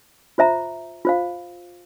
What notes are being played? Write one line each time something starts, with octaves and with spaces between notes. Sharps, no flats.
F4 C5 E5 A#5
F4 C5 F5